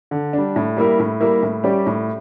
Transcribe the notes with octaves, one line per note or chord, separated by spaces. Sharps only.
D3
G3 D4
A2
G3 A#3 E4 A#4
A2
G3 A#3 E4 A#4
A2
G3 C#4 G4 D5
A2